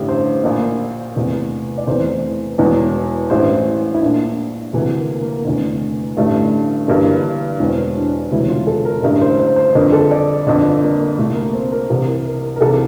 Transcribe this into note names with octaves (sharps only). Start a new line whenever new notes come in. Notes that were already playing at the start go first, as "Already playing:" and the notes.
Already playing: A1 G2 D3 G4
C5
A#1 A#2
F1 E2 C3
D5
F1 E2 E3 C5
E1 E2 E3
A1 G2 E3 C5
E4
A#1 A#2 D4
D2 C3 E3 A3
A#3
A#3
F1 E2 D3
A1 G2 D3 A3
G1 G2 E3 A#3
E1 E2 E3 C4
D4
E1 D2 C3 E3 E4
F4
A4
A#4
A1 G2 D3 A#4
C5
C5
C5
G1 F2 D3 A#4
A4
D5
G1 F2 D3 D4
A#3
C2 A#2 A3
A#3
C4
A#4
C2 C3 E3 A#4
A#4
A#4
C2 C3 E3 A4